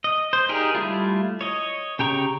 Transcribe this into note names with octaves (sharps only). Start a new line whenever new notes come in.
D#5
C5
D#4 G4 G#4 A#4 D5
G3 A3 E4 F4
C#5 D#5
C#3 G4 G5 A#5 C#6